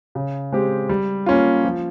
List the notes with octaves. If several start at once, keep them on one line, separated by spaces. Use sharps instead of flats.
C#3
G#3 C4 G4
G3
A#3 C#4 F4
F3